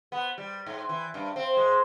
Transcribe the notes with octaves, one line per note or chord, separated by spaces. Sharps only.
B3
G3
G#2
E3
G2
C4
G#3